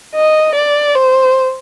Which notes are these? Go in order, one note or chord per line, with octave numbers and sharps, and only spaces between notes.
D#5
D5
C5